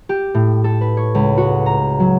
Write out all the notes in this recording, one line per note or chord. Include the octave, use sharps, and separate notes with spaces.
G4
A2
A4
B4
C#5
C#2
F#4
A#5
F#3